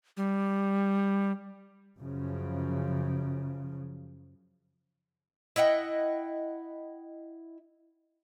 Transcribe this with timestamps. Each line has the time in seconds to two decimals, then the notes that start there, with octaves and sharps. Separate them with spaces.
0.17 G3
1.98 F#2 C#3 F3
5.56 E4 D#5 F#5 G5